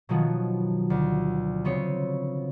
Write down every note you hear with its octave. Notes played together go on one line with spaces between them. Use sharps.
B2 D#3 F3 F#3 B3
D2
C#3 B3 C4 C#5